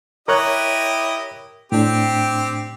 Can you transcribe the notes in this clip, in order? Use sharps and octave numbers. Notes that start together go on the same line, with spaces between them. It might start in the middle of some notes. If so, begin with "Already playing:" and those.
E4 G4 A#4 C#5 D#5 F#6
A2 C4 D4 G4